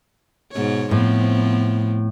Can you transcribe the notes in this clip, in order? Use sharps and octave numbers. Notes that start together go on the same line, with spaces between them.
G#2 B2 C#5
A2 F3 B3 C4